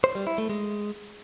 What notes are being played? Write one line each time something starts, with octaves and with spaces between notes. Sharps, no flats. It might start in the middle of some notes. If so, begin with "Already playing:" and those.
C5
G3
E4
A3
G#3